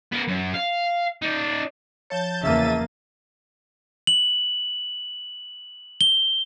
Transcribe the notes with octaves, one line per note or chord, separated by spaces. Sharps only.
B3 A#4
F#2
F5
D#4 D5
F3 C#5 A5 G6 A6
E2 C#3 A#3 E5 A5 A6 D#7
F#7
G7